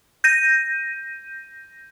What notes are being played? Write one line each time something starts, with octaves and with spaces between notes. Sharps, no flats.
G6 A#6 D#7